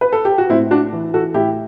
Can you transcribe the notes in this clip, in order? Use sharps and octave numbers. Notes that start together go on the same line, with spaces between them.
B4
A4
G4
F#4
A2 C4 E4
D4 F#4
E3
F#4 A4
A2 E4 G4